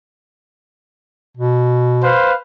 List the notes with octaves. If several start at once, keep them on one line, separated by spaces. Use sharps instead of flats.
B2
B4 C5 F5